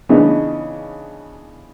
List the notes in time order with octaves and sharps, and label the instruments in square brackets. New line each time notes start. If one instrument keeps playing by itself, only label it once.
[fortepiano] C#3 E3 B3 D4 D#4